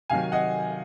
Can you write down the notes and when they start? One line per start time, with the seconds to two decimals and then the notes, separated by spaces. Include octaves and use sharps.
0.10 C3 D#3 F#3 F5 G#5
0.32 D#5 F#5